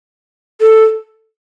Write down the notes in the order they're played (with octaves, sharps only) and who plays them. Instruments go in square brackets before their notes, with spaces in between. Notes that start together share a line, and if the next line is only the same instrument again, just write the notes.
[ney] A4